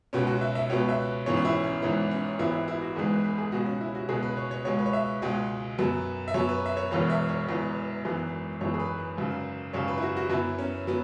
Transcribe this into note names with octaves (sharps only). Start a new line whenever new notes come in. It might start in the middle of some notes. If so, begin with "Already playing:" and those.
C#2 B2 B3 C#4
F#4
E5
E5
C#2 B2 B3 C#5
E5
G#1 G#2 E3 B3 C#5
C#4
E4
C#4
G#1 G#2 E3 B3 E4
C#4
G#1 G#2 E3 G#3 B3 E4
E4
E4
F#4
G#1 G#2 E3 G#3 B3 G#4
B4
B4
G#4
C#2 B2 G#3 B3 F#4
C#4
E4
F#4
C#2 B2 G#3 B3 G#4
B4
C#5
C#5
C#2 B2 G#3 C#5
B4
C#5
E5
C#2 B2 G#3
F#2 F#3 B3
E5
F#2 F#3 B3 C#5
B4
E5
C#5
E1 E2 E3 B3 C#5
E5
C#5
E1 E2 E3 B3
G#1 F#2 E3 B3
G#1 F#2 E3 B3 C#5
G#4
B4
B4
G#1 F#2 C#3
G#1 F#2 C#3 C#5
B4
E4
F#4
F#4
F#2 F#3 B3 E4
C#4
F#3 B3